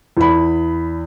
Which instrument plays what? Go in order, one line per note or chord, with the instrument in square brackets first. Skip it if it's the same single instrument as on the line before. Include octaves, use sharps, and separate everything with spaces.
[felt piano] E2 B5